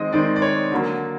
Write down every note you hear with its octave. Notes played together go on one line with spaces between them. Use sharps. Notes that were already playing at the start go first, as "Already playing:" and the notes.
Already playing: D#3 G#3 C4 D#5
D#3 G#3 C4 D5
D5
C#5
D3 F#3 A#3